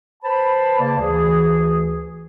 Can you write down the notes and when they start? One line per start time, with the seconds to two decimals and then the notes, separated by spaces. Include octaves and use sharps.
0.24 B4 C5 A5 B5
0.79 C#3 A#3 D5 A5
0.98 D2 E3 G#4